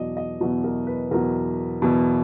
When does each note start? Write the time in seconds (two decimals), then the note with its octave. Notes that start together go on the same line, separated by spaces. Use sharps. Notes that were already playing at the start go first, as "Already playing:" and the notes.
Already playing: E2 B2 F#3 D5 D#5
0.17 D#5
0.41 E2 B2 F#3
0.64 A#4
0.87 B4
1.11 E2 B2 F#3 A#4
1.82 E2 B2 F#3